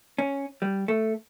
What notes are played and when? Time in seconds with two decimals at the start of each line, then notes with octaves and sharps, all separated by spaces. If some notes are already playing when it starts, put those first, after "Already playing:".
0.18 C#4
0.62 G3
0.88 A3